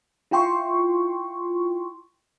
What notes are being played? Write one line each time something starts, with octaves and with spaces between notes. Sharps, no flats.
E4 F4 G5 C6 C#6